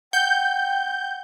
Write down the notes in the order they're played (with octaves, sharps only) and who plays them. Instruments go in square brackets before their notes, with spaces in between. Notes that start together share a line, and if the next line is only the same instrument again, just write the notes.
[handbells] F#5 [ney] G5 [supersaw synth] G6